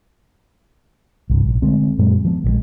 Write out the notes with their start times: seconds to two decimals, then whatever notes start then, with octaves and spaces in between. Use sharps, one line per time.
1.30 C2 G2
1.45 A#1
1.62 D3 G#3 A3 C4
1.98 F#2 A#2 F#3 G#3
2.25 F3 B3
2.44 A#1 F3 G#3